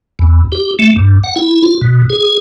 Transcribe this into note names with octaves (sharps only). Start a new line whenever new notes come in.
E2
G4
A3
G2
F#5
E4
F4
B2
G#4